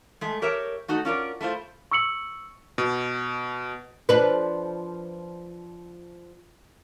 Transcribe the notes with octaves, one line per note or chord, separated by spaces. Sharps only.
G#3 A3
G4 A#4 C#5 E5
A3 D#4 F#4 A4
C#4 F4 A#4 D5
A3 E4 F4 C5
C#6 E6 C#7 F#7
B2
F3 D4 B4